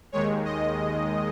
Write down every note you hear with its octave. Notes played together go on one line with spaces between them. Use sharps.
D#2 D#3 G#3 C#5
D#5